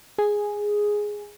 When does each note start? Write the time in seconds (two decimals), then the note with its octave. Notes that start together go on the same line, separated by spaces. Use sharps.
0.18 G#4